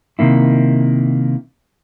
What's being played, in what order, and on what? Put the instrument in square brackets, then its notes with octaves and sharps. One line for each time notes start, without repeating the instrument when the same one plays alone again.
[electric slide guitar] C3 D#3 A#3 E4